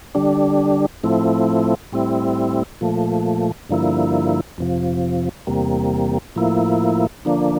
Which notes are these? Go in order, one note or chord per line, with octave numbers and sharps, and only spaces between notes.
D3 G3 D4
A2 F3 A3 C4 E4
A2 G3 C4 E4
A#2 F3 A3
G2 D3 F3 A#3 E4
F2 C3 F3
E2 C3 G3 A#3
A2 F3 A#3 E4
D3 F3 A#3 D4